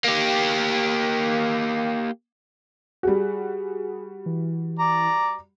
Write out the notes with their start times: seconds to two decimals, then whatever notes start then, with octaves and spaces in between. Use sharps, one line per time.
0.04 A#3 G4
3.03 G3 F#4 G#4
4.26 E3
4.79 D5 A#5